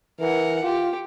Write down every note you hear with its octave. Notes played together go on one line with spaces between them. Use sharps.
E3 A#4 F#5
F4 G4